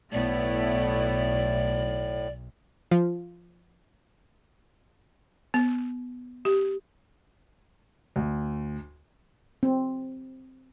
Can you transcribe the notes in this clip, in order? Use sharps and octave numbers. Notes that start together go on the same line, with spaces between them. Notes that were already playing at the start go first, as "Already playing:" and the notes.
B1 A2 A3 B3 E4 D5
F3 F4
B3
G4
D2
C4